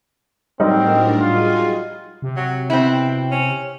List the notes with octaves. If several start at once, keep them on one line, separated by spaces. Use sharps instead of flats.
A2 F#3 G3 C4 D4 D#4 A#4
F4 F#4 G#4 G#5
C3
F#3
B2 C4 E4
C#4